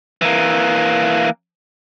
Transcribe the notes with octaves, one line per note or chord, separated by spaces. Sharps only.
E3 A#3